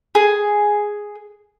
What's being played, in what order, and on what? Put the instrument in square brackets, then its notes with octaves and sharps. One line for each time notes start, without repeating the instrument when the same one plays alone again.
[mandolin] G#4